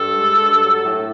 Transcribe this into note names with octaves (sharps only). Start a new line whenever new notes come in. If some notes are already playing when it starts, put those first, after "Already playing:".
Already playing: G2 A4
G#3
G2
F#3
A2